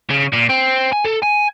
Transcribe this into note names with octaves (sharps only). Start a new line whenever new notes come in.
C#3
A#2
C4
G#5
A4
G#5